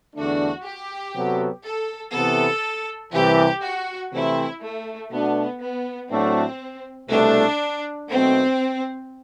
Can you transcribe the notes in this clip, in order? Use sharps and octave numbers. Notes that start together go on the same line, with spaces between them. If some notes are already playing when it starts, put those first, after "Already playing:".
E2 D3 A3 D4 F#4
G4
C3 F#3 B3 F#4 A4
A4
C3 E3 B3 A4
C2 C3 E3 G4
F#4
C3 E3 A3 C4 E4
A3
B2 A3 B3 D4 F#4
B3
A2 F#3 A3 C4 D4 F#4
C2 B2 A3 D4
B1 B2 A3 C4